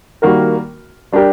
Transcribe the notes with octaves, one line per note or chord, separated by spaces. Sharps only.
D#3 G3 A#3 F#4 A#4
G3 D4 G4 A#4